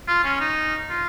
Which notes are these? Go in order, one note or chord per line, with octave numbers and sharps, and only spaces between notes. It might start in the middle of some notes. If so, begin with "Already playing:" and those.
F4
C#4
D#4
F4